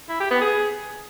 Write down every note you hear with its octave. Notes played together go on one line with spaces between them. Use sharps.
E4
G4
B3
G#4